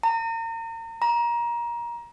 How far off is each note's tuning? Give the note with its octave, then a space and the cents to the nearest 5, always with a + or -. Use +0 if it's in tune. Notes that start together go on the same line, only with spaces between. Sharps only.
A#5 -35
A#5 +25